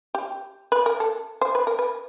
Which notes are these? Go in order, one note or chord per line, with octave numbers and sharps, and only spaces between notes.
G4
B4
A#4
A4
C5
B4
A#4
B4